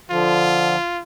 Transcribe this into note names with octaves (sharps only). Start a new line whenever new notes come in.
D3 F3 F4